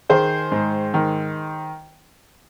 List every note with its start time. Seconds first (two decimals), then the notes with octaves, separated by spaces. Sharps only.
0.09 D#3 G#4 C5
0.52 G#2
0.94 D#3